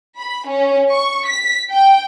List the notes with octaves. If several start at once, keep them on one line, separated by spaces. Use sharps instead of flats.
B5
C#4
C#6
B6
G5